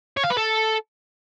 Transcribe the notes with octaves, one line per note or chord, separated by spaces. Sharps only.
C#5
F5
B4
A4